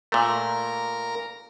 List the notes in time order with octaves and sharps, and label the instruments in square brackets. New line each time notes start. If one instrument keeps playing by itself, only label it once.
[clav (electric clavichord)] A#2 A3 [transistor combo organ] A#4